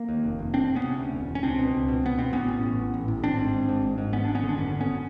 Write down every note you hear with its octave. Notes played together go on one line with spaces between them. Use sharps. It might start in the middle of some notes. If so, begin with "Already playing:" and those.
Already playing: A#3
D#2
F1
F1
E1 C4 D4
E1
B3 C#4
C3
D2
E1
E1
C#4
C#2 C4 D4
B2
C#2
B2
C#2 B3
B2 C4
A1 B3 C#4
A2
A1
A2
A1
A2
G#1 C4 D4
G#2
G#1
G#2
G#1
G#2
G#1 B3 C#4
G#1 D4
B3 C#4
D3
D4
F#2 B3 C#4
G#1
B3 C#4